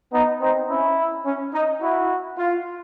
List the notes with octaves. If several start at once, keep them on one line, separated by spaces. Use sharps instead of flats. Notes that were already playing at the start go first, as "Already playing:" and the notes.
B3 D#4
C4 D#4
C#4 E4
C#4
D#4
E4 F#4
F4